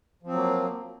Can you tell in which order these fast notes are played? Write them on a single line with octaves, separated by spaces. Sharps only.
F3 C4 F#3 A#3